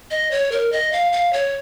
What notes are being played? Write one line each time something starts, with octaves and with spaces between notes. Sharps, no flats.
D#5
C#5
A#4
D#5
F5
F5
C#5